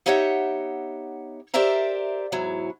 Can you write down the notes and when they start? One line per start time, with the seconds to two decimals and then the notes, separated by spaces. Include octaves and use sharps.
0.06 B3 D#4 G4 C#5 E5 F#5
1.54 G4 A#4 C5 D5 E5 A#5
2.32 E2 G#2 F#3 E4